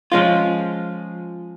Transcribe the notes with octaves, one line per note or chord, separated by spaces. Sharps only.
F3 G#3 C#4 F4